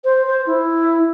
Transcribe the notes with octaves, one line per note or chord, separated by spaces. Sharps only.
C5
C5
E4